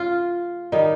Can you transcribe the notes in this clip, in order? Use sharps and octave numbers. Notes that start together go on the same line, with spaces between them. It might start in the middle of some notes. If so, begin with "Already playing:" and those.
Already playing: C#3 A3 F4
D#3 G3 D#4